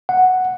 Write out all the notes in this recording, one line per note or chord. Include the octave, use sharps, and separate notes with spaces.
F#5